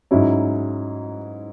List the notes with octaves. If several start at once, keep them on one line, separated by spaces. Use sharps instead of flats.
G#2 F#3 C#4 E4